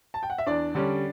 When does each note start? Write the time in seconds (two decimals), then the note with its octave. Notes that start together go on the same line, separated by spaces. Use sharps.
0.14 A5
0.23 G5
0.30 F#5
0.38 E5
0.46 E2 D4 D5
0.75 D3 G3 C#4